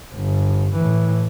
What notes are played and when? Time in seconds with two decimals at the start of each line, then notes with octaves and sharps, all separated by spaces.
0.15 G1
0.75 A2 E3